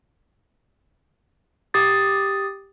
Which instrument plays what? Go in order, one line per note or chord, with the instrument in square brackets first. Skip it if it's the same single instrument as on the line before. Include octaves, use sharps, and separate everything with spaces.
[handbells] G4 D#6 A6